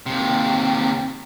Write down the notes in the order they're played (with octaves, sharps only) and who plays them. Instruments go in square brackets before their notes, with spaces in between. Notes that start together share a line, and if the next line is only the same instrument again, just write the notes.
[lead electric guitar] D#2 C3